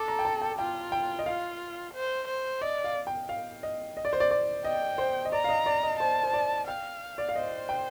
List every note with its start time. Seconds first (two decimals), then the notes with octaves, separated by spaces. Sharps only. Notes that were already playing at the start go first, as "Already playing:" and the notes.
Already playing: A4 D6
0.08 A#5
0.19 G5
0.25 A5
0.42 G5
0.59 F4 G5
0.92 G5
1.19 D#5
1.26 F4 F5
1.94 C5
2.28 C5
2.61 D5 D#5
2.84 F5
3.07 G5
3.29 F5
3.63 D#5
3.97 D#5
4.05 D5
4.13 C5
4.20 D5
4.31 D5
4.64 D#5 G5
4.98 C5
5.25 D#5
5.32 D5 A#5
5.44 F5
5.49 D#5
5.66 D5
5.83 D#5
6.00 C5 A5
6.23 C5
6.33 D5
6.67 F5 G5
7.18 D5
7.29 F5
7.35 C5 D#5
7.69 G5